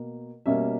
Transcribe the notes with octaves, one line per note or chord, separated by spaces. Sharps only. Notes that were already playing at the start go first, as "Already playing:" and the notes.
Already playing: B2 A#3
B2 G3 A#3 C#4 E5